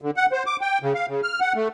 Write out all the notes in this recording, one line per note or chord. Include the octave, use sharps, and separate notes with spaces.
D3
F#5
C5
D6
G5
C#3
F5
C#3
F6
F#5
A3